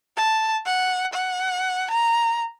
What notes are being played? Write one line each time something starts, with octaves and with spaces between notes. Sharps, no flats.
A5
F#5
F#5
A#5